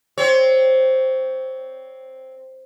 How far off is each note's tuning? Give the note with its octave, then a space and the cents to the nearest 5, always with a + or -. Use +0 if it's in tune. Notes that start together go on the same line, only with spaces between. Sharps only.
C4 +0 C#5 +25